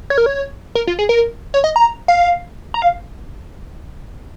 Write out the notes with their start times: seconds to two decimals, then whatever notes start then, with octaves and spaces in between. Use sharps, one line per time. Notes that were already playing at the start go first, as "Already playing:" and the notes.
0.10 C#5
0.18 A#4
0.26 C#5
0.75 A#4
0.87 F4
0.99 G#4
1.09 A#4
1.54 C#5
1.64 D#5
1.76 A#5
2.08 F5
2.74 A#5
2.82 F5